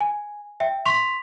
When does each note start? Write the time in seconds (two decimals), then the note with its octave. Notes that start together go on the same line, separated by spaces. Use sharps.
0.01 G#5
0.60 E5 G5
0.85 C6 C#6 B6 F7